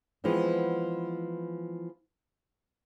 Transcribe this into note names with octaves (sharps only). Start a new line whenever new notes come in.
E3 F3 G#3 B3 C4